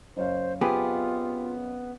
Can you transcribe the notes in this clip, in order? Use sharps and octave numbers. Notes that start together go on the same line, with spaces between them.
F#1 C5 C#5 F5
B3 C4 F4 G4 G#4 B4